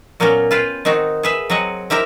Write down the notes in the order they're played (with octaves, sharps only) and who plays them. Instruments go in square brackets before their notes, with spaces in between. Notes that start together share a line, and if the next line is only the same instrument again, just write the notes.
[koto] A#2 F#3 A#3 B3 C#4 A#4
F4 B4 F5 G5
D#3 C4 D#4 F#4
G#4 B4 E5
F#3 C4 D#5 F#5 G#5
C4 E4 G4 A#4 E5